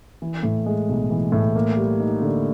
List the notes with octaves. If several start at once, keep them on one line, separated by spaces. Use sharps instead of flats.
E3
A2
G#3
B1
E3
A2
A#3
G3
D#4
D3